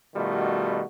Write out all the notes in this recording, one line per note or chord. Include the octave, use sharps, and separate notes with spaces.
B2 D#3 G3 A3 F4 F#4